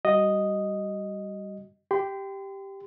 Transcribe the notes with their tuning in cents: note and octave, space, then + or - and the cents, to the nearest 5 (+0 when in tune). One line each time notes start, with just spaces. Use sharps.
G3 +0 F#4 +35 D#5 +0
G4 +0 C6 -35